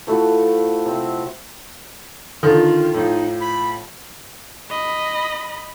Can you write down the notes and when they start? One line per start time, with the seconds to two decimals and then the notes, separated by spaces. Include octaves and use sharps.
0.07 F3 A3 E4 F#4
0.86 C3 C4
2.43 D3 D#3 F3 F4 A4
2.94 A2 F3 D#4
3.41 B5
4.70 D#5 B5